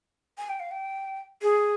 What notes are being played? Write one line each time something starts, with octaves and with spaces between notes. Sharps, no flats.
G#5
G5
F5
G5
G#4